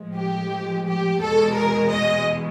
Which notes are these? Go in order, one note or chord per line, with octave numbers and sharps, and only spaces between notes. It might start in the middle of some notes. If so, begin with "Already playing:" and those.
Already playing: A2 F3 G#3
G4
G4
E2 B2 G#3 A4
A#4
D#5